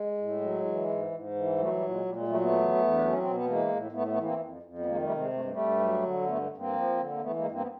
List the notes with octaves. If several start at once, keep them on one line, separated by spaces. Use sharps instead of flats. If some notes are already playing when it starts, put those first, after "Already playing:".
Already playing: G#3
A2
F#3
E3
G#2
G#2
E3
F#3 G3 A3
G3
A#2
G#3
A#2 G3
G#3
F#3 G3 A3
A3 B3
E2
E2
D4
F#3
C#4
B2 C4
B3
E3 G#3 A#3
A2
A2 A3 B3
A3 B3
E3
A#3 C4
F2
F2
B3
D#3 G#3 A#3
G3 A3
C3
G#3
G2 A3
G#3
G3 A3
G2
F#3
D3
G2 A3 B3
G2
A#3 C4
F3
D3
A#3
E3 A3 B3
G#3 A#3
G2
A#3 C4
B3